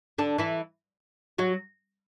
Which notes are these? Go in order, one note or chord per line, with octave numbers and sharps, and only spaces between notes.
D3 D4
E3 E4
F#3 F#4